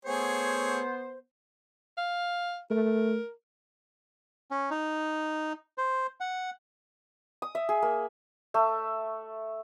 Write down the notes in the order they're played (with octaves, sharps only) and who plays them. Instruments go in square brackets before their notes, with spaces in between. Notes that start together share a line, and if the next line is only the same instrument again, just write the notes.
[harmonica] A3 G#4 C#5 [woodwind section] B3 C5
[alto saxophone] F5
[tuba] A3 [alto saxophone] A#4
[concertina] C#4
D#4
C5
F#5
[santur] D#6
E5
G#4
A#3
A3 E5